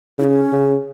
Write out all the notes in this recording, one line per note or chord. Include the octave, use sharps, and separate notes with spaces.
C#3 E4
C#4
C#3